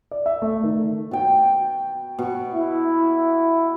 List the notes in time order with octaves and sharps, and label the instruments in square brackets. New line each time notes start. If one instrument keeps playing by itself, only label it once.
[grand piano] D5
E5
A3
D#3
[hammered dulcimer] B2 G5
B2 C#6
[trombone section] E4